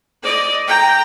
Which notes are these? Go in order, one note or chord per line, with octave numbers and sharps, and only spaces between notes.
D5 D#5
G5 A#5